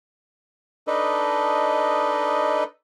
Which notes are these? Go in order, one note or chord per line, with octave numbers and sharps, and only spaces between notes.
D4 D#4 A4 B4 D#5